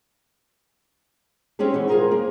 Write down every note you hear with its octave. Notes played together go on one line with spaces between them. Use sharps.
C4 C#4 G4 G#4
B2 E3 C#4
F4 G#4 A#4 C5
A#3